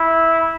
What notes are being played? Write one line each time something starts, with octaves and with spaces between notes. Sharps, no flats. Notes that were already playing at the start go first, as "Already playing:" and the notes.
Already playing: E4